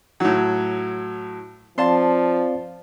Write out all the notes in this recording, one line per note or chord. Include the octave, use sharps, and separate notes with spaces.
A2 F#3
F3 C4 D5 F5 A5 C6